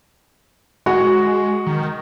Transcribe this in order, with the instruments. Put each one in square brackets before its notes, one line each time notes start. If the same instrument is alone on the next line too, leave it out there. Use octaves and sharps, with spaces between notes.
[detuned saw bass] G#3 [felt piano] F#4
[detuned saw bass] D#3